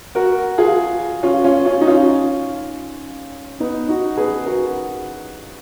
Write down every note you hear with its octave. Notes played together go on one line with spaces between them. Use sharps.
F#4 A#4
F4 G#4
C#4 F4
C#4 F4
C#4 F4
D#4
C#4 F4
B3 D#4
D#4 F#4
G#4 B4
F#4 A#4